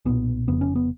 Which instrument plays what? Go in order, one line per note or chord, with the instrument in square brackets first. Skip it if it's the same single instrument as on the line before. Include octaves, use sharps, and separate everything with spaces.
[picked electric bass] B1 A#2 B3
F1 F2 C#3 B3
C#4
B3